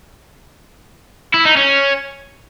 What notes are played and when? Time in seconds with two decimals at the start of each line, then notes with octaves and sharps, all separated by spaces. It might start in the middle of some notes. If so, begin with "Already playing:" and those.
1.34 E4
1.45 D#4
1.57 C#4